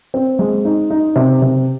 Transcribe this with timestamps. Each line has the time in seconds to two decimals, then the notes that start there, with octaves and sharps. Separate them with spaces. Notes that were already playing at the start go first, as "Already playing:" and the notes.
0.14 C4
0.39 G#3
0.65 D#4
0.90 D#4
1.16 C3
1.42 C3